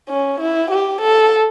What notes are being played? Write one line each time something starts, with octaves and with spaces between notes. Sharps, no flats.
C#4
E4
G4
A4